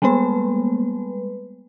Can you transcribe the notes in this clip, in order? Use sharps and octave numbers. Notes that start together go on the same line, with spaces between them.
G3 G#3 A#3 B3 B4